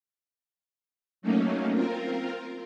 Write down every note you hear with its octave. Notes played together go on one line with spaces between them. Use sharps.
F#3 A3 A#3 C#4 D#4
C4 F4 A#4